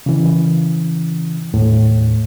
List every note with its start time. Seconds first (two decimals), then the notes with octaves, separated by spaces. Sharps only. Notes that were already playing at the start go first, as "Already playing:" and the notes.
0.06 C#3 E3
1.53 D#2 A2